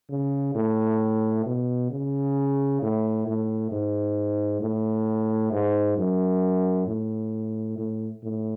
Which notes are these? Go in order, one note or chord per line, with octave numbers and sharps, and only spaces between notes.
C#3
A2
B2
C#3
A2
A2
G#2
A2
G#2
F#2
A2
A2
A2